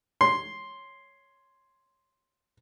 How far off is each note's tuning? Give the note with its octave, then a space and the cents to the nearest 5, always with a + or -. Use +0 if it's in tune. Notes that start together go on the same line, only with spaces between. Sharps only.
C#5 +0 C6 +0